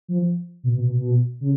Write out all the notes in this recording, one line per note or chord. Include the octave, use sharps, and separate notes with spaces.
F3
B2
B2
B2
B2
C#3